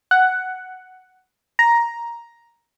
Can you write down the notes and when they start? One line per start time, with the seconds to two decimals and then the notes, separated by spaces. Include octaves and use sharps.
0.11 F#5
1.59 A#5